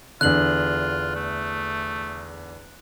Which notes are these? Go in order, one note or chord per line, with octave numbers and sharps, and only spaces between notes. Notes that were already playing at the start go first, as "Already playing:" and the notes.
E2 D3 F4 F#6 F#7
A3